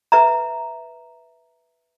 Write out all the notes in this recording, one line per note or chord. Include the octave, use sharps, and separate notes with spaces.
B4 E5 A#5